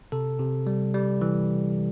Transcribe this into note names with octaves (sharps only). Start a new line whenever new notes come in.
C3 A4
C3
G3
G3
E3